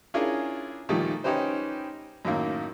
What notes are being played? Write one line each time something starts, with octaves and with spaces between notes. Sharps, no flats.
C#4 D4 E4 F4 G#4 A#4
A#2 D#3 F3 G3 A3
C#4 D#4 G4 B4 C5
F#2 A2 D#3 A#3